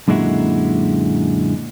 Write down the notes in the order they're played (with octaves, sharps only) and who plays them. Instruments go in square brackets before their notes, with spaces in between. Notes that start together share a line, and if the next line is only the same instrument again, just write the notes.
[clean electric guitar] F#2 A#2 D3 G#3 E4 F#4